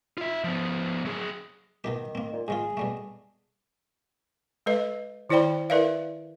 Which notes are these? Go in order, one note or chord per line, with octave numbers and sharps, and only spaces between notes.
F4 E5
F3 B3
F#3 G#4
B2 D#3 D#4 G4
A#3 C4
A#2
G#2 D#3 F4 G#4
B2 G3 A3
G#3 A4 B4 D#5
D#3 E4 C5 D5 G5 B5
E4 A#4 B4 D5 E5 F5